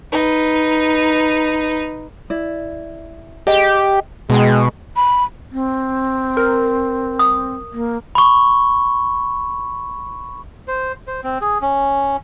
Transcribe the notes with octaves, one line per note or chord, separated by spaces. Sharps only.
D#4 B4
E4 D5
G4 G#4 D#5 G5
B2 G#3 G5 A#5
B5
C4
A#4
D#6
A#3
B5 C#6
C5
C5
C4
G#4
C#4